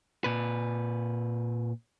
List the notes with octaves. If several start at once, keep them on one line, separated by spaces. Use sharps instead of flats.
A#2 B4